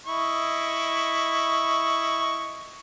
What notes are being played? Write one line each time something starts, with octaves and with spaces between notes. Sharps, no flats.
E4 D#5 C#6